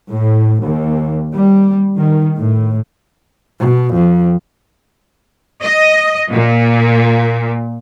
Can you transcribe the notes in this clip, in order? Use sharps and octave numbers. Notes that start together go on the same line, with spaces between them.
A2
D#2
G3
D#3
A2
B2
F2
D#5
A#2